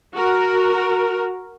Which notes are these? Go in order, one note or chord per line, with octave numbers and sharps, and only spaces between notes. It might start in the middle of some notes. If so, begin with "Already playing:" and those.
F#4 A#4